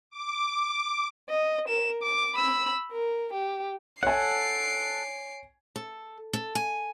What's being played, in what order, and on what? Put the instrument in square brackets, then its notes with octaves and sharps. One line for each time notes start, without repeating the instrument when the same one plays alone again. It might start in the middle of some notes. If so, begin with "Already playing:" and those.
[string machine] D6
[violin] D#5
A#4 E7
D6
B5 E6
A#4
G4
[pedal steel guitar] A4 F#5 [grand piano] C#5 G#5 [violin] C7 D7
[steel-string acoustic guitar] A4
A4
G#5